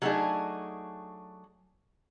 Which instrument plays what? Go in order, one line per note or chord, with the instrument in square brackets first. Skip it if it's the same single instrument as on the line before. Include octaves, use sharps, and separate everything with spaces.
[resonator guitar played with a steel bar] F#3 G3 A3 D4 D#4 G#4